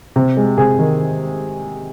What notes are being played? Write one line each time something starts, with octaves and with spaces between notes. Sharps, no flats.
C3
G#3
C3 G#4
D#3